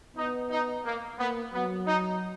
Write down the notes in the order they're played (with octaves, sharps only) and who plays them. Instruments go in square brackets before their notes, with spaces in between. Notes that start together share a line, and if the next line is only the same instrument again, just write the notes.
[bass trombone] B3 [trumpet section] D#4
[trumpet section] D#4
A#3
[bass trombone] A#3 [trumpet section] B3
[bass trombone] F#3 [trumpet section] B3
[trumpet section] D#4